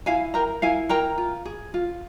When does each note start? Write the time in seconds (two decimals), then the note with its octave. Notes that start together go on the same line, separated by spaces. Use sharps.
0.06 E4 F5 G#5
0.34 A#4 G5 A#5
0.62 E4 F5 G#5
0.89 A#4 G5 A#5
1.18 F4
1.45 G#4
1.74 F4